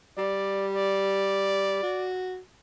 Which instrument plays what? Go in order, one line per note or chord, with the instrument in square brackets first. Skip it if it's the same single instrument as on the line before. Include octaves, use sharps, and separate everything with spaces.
[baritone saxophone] G3 [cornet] D5
[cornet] D5
[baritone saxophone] F#4